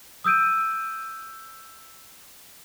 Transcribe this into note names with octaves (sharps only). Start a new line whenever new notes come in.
D#6 E6 G6 D7 D#7